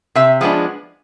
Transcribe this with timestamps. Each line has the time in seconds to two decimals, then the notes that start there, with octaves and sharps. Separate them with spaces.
0.15 C3 E5
0.41 F3 G#3 B3 D4